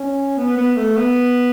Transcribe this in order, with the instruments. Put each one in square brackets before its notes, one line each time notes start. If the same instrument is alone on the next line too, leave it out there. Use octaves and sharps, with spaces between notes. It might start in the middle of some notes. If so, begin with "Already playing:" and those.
Already playing: [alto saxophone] C#4
B3
B3
A3
B3